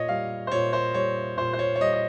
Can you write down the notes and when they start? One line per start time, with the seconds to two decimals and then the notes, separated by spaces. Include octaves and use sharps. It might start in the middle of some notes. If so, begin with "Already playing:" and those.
Already playing: A#2 C#5 D#5
0.08 G3 F5
0.47 C5
0.51 A#2 C#5
0.73 C5
0.94 G3 C#5
1.37 A#2 C5
1.53 C5
1.59 C#5
1.75 C#5
1.80 G3 D#5
1.93 D#5